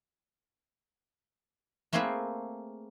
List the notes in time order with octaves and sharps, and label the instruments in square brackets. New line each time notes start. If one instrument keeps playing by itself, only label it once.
[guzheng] A3 A#3 C4 G#4 A#4 B4